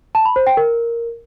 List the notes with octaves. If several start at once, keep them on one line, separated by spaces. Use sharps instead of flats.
A5
B5
C5
G5
A#4